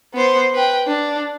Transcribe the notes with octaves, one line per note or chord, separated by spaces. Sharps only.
B3 C5
B4 G5
D4